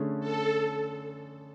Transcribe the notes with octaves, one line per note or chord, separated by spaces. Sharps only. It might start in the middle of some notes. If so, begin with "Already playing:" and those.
Already playing: D3 A3 C#4 G#4
A4